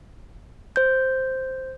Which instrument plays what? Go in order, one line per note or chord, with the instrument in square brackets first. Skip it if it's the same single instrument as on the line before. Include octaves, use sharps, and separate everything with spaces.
[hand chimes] C5 G6